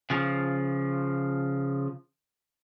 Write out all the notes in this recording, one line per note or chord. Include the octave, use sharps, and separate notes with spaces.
C#3 F3